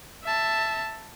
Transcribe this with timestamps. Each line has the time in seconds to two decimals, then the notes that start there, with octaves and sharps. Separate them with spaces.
0.24 E5 A5